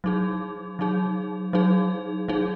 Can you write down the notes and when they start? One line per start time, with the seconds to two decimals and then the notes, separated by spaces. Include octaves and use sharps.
0.04 F#3 D#4 G#4
0.79 F#3 D#4 G#4
1.53 F#3 D#4 G#4
2.28 F#3 D#4 G#4